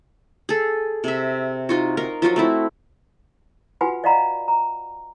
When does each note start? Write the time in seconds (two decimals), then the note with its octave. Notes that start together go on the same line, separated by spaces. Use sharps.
0.49 G#4 A4
1.04 C3 E5
1.69 D#4 F4 F#4
1.97 D#4 A#4 F5 C#6
2.22 F3 F#3 F4 F#4
2.36 A3 C4 E4
3.81 F4 F#4 B4 F#5 G#5 B5
4.04 D5 D#5 F5 F#5 A#5 B5
4.48 A#5